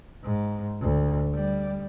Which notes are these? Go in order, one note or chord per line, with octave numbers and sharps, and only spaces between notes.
G#2
D2
G3